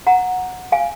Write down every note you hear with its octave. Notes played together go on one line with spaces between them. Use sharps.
F#5 A#5
F5 G#5